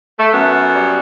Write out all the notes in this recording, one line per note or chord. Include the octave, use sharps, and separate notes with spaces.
A3
F#2 B3
G3